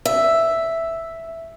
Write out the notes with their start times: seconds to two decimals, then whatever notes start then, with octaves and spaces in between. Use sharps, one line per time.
0.05 E5